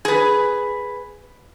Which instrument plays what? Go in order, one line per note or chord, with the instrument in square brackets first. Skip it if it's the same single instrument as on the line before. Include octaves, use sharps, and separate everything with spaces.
[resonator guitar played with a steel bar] G#4 B4